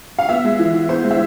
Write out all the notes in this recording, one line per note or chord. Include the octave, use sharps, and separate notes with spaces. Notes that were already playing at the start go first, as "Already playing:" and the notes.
F5
B3 E5
G#3
E3
E3
B3 C5
G#3
E5